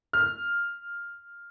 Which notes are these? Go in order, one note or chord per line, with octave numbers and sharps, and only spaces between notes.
F6